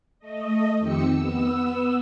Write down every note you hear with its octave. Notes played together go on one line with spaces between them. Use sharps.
A3 D#5
F2 D#3 C4 G4 E6 C#7
B3 E6